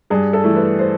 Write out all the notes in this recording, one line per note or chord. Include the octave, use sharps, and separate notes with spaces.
G2 G#4
A4
E3 A3
B4
C5